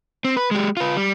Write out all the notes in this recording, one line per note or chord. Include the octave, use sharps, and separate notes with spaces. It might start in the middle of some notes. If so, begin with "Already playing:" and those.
C4
B4
G#3 G4
F4 B4
G3